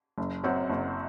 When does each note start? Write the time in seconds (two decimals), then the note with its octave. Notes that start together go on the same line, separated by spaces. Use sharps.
0.18 F#1
0.43 F#2 F#3 C4 F#4
0.70 F#1